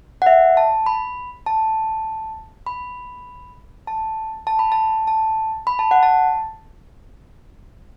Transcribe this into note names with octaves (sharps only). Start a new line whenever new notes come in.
F#5
E5
A5
B5
A5
B5
A5
A5
B5
A5
A5
B5
A5
F#5
A5